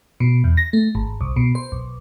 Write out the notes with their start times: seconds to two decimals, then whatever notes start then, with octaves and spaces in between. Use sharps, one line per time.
0.20 B2
0.44 E2
0.57 A#6
0.73 A3
0.95 G#1
1.21 C2
1.36 B2
1.55 C5
1.72 B1